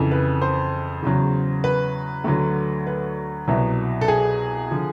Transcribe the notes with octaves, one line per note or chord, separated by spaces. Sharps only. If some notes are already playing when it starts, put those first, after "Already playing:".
Already playing: F2 C#3 E3
B4
C5
E2 C#3 F#3
B4
D2 D3 F#3
B4
C2 B2 F#3
A4
G#4
D3 F3